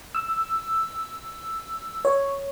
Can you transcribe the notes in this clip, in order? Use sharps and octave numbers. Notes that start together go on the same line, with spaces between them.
E6
C#5